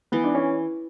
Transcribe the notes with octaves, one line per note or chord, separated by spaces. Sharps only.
E3 B3
D4
C#4